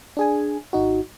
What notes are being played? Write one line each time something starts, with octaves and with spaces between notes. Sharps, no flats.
D4 G#4 G#5
G#1 D#4 F#4